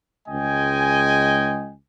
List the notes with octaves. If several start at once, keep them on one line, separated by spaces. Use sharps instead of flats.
C#2 G#3 D#5 G5 G#5